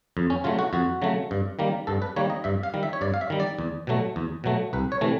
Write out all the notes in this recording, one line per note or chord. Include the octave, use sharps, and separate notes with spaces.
F2
C#4
C#3 F#3 A3 F4
F#4
F2 F#4
C#3 F#3 A3
G2
D#3 G3 A#3
G2 A4
B4
D#3 G3 A#3 C#5
D#5
G2 E5
F5
D#3 G3
E5
C#5
G2 D5
F5
E5
D#3 G3
D5
E2
B2 F#3 A3
E2
B2 F#3 A3
C2 B4
C#5
C3 E3 A3